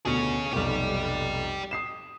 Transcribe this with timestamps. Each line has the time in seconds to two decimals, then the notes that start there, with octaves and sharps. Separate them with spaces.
0.05 D2 B2 G#4 C#5 C#7
0.53 F1 B1 G4 D5
1.71 D#6 C7 E7